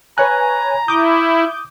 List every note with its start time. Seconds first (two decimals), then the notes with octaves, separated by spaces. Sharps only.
0.18 B4 C#5 G#5 A#5 F#6
0.88 E4 D6 D#6 G6